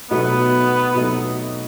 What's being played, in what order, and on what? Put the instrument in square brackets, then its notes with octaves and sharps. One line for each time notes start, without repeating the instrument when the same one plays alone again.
[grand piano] B2 F#3 A3 D#4 [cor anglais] B3
[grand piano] B2 F#3 A3 D#4